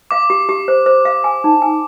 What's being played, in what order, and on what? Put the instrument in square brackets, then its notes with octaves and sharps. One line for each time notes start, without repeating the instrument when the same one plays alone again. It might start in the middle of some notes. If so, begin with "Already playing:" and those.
[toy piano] F5 [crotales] D6
[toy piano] G4
G4
C5
C5
F5
G#5
D#4
G#5